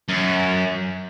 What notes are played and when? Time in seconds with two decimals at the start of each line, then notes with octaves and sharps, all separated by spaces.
0.08 F#2